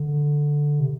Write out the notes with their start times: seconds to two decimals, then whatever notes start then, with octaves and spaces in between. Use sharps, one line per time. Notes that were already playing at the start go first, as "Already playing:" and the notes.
Already playing: D3
0.80 C3